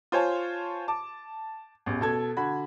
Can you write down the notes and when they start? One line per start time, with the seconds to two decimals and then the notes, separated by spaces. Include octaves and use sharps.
0.12 F4 C5 C#5 G#5 A5
0.88 A5 D6
1.86 A1 E2
2.01 B2 A4 G#6
2.37 D3 F#4 B5